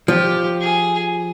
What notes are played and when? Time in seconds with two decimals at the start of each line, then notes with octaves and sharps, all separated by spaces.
0.08 F3 G4
0.61 G#4